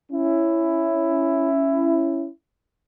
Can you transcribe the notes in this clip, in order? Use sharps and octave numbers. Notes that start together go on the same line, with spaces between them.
C#4 E4